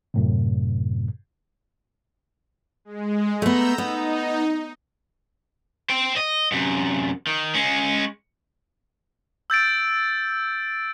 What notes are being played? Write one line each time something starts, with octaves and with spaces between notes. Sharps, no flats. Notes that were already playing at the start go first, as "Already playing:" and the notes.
F#2 A2 C3
G#3
A3 B3 A#5 E6 G6
B3 D#4
C5 G5
D#5
F#2 C3
D#3
G#3 C#4
E6 G6 A6 D7